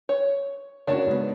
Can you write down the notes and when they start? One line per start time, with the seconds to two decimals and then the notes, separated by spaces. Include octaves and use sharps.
0.09 C#5
0.87 C#3 A#3 D4 F#4 C#5 A5
1.07 G#2 B3